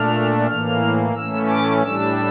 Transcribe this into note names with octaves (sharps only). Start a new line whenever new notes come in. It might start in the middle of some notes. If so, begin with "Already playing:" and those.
Already playing: A#2 A3 D4 F6
A2 E3 A#3 F6
A2 E3 A3 C#4 E6
D6
A2 G3 D4 E6